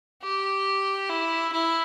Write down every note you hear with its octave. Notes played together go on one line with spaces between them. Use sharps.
G4
E4
E4